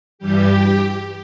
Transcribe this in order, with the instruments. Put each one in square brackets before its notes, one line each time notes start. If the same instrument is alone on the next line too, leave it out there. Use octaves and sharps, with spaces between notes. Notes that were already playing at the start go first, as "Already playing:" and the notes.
[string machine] G2 E3 G3 G4